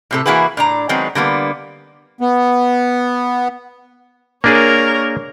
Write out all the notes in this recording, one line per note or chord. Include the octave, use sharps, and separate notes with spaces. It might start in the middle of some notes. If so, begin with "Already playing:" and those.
A2 C3 A4
E3 A#3 E4 F#4 G#4 B4
A2 D4 A#5
D#3 F#3 G#3 B3 C4
D3 G3 A#3 B3
B3
A#3 D4 G#4 A#4 C#5